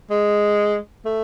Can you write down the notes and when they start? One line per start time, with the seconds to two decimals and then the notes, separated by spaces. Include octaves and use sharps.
0.10 G#3
1.05 A3